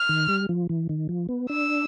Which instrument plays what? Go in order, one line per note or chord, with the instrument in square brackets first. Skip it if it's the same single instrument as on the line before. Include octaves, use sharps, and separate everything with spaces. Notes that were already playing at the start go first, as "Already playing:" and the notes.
Already playing: [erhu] F6
[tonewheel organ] D#3
G3
F3
E3
D#3
F3
B3
[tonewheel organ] D4 [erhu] E6